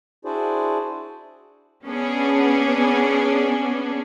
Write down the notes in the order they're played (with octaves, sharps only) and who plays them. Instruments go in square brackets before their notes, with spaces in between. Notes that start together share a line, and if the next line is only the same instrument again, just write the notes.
[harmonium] D4 E4 F#4 G#4 C5 D5
[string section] B3 C#4 D4 G#4